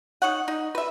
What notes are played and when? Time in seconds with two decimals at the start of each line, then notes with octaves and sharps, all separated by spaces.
0.22 D#4 C#5 F#5
0.48 D#4
0.75 B4 E5